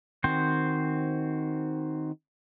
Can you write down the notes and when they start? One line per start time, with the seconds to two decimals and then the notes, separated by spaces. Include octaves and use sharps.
0.24 D#3 C4 F#4 C5